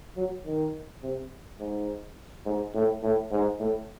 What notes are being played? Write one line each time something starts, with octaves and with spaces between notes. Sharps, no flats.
F#3
D#3
C3
G#2
G#2
A2
A2
G#2
A2